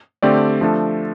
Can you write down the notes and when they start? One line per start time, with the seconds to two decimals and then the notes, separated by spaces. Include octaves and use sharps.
0.23 D3 A3 C4 G4 D5
0.61 F3 A3 D4 A4